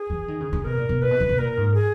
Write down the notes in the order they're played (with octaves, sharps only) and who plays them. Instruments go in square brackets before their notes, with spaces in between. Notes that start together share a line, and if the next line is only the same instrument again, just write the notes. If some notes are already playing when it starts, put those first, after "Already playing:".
Already playing: [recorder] G#4
[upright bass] E3
D#3
C#3
C#3
[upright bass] B2 [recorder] A#4
[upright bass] A#2
B2
[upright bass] A#2 [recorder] B4
[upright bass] B2
D#3
B2
[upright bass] A#2 [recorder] A#4
[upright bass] G#2
[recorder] G#4